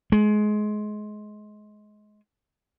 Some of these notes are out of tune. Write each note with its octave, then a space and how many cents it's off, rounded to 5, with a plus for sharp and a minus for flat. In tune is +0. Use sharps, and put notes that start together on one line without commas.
G#3 +25